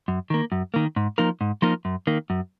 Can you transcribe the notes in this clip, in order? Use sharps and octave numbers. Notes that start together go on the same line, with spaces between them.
F#2
D#3 A#3
F#2
D#3 A#3
G#2
F3 A#3 D#4 A#4
G#2
F3 A#3 D#4 A#4
F#2
D#3 A#3
F#2